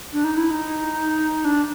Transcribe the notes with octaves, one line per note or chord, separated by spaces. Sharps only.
D4
D#4
E4
D#4
D4